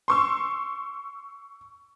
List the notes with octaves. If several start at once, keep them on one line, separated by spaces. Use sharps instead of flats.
C6 C#6 E6